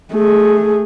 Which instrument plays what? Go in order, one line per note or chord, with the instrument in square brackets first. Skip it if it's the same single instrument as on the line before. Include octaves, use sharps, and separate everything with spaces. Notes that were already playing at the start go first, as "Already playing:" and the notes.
[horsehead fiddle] A3 G#4